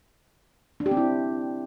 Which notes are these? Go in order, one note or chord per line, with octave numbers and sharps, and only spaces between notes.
D4
G4
C4
E4